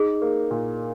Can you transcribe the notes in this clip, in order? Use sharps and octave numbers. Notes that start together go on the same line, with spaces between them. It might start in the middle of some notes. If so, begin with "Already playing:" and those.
Already playing: D#4 G#4
A#3
A#2